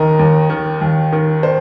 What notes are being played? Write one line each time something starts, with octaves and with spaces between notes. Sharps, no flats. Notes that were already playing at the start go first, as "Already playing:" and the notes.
Already playing: D#2 D#3 A#4 D#5
D#2
D#3
D#2
D#3
C5